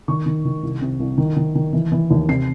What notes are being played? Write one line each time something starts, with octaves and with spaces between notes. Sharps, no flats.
D#3 C#6
D#3
D#3
C2
C3
C2
D#3
D#3
D#3
E3
E3
D#2
C3 C7